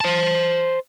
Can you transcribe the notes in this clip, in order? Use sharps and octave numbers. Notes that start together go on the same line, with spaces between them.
C5 A5